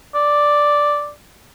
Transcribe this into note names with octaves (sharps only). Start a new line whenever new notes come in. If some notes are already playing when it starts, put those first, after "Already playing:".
D5